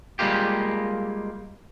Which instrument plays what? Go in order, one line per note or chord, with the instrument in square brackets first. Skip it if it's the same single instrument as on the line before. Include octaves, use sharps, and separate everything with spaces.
[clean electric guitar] G3 G#3 A#3 F4 G4